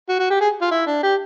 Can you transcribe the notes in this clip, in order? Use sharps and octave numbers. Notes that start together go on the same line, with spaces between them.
F#4
F#4
G4
G#4
F4
E4
D4
G4